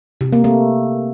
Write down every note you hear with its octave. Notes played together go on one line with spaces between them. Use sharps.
C3
A#3
A3